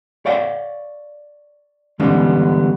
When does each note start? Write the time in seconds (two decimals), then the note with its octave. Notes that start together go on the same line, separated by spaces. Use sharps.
0.26 C#5 D5 F5 G5
2.00 D3 E3 G3 G#3 B3 C#4